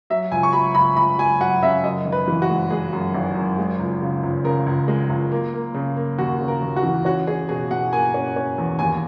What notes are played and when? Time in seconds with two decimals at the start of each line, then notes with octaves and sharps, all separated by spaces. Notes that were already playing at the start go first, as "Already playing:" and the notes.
0.10 F#3 E5
0.32 C#2 G#5
0.43 C#6
0.53 F#3 B5
0.75 C#2 B5
0.96 C#2 B5
1.18 F#3 G#5
1.40 F#3 F#5
1.63 C#3 E5
1.84 F#2 D#5
2.05 G#1
2.12 B4
2.28 E3
2.42 F#4
2.49 G#3
2.71 G#3 G#4
2.93 F#2
3.14 G#1
3.35 F#2
3.58 G#3
3.79 C#2
4.01 C#3
4.23 C#2
4.44 C#3 A#4
4.66 C#2
4.88 G#3
5.09 C#2
5.32 A#3
5.54 A#3
5.74 C#3
5.96 A#3
6.18 D#2 F#4
6.41 C#3
6.48 A#4
6.63 D#2
6.76 F#4
6.83 E3
7.05 C#4 F#4
7.27 C#4 G#4
7.49 B2 G#4
7.71 B2 F#5
7.93 A#3 G#5
8.14 C#4
8.36 C#4
8.58 E2
8.79 D#2 G#5